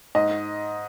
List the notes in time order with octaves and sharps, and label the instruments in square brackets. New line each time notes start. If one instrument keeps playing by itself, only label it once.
[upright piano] G#2 D#5